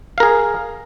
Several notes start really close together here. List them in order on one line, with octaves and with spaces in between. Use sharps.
F5 A#4 G#4